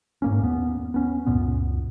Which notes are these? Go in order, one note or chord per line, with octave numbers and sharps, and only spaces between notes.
G#2 A#3 C#4
D#2 B3
B3 C#4
C#2 F#2 A#2 B3